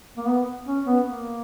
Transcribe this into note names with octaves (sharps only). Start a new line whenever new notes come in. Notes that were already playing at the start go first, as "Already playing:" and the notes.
A#3
B3
C#4
B3
A#3